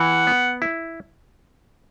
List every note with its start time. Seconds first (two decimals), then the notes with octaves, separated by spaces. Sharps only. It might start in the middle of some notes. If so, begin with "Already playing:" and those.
Already playing: E3 F#5
0.27 B3
0.62 E4